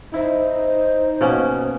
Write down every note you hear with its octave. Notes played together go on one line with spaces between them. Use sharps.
D#4 E4 C5
B2 A#3 C#4